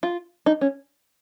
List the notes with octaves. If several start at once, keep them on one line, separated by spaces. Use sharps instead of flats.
F4
D#4
C#4